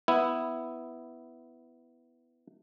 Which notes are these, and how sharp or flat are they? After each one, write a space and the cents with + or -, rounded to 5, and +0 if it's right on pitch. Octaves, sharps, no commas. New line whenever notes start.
B3 +10 E4 +0